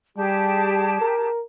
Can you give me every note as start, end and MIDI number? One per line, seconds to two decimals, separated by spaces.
0.18 1.01 55
0.18 1.30 67
0.18 1.30 68
0.18 1.30 81
1.01 1.43 70